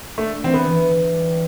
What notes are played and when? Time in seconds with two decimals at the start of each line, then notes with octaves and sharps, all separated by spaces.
0.18 A3 D4
0.43 E3 C4
0.54 B3
0.66 E3
0.91 E3
1.14 G3